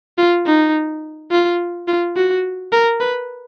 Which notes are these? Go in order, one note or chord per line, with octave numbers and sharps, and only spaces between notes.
F4
D#4
F4
F4
F#4
A#4
B4